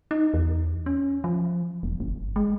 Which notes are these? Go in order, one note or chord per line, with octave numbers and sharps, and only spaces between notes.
D#4
E2
C#4
F3
E1
G1
G#3